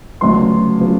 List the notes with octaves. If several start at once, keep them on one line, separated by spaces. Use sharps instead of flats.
D2 C#3 F#3 B3 C6
C#3 F#3 B3